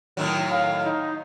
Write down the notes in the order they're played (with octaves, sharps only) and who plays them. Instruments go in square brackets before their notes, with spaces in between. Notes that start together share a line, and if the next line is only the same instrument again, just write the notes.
[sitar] A2 D#3 F#3
[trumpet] F5
D#4